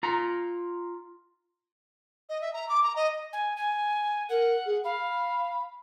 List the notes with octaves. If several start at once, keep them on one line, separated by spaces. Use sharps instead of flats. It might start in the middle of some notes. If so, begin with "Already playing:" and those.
F4 A#5
D#5
E5
A#5
D6
A#5
D#5
G#5
G#5
A#4 F#5
G#4
F5 B5